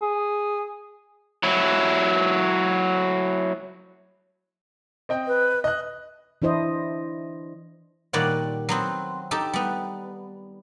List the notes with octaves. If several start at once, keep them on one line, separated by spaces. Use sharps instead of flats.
G#4
F#3 E4
C4 D#5 G5
B4
D#5 F#6
E3 D4 E4 C5 D#5
A#2 D#3 G3 C#5 D5 F#5
F#3 B3 C4
D#4 G4 A4
G3 B3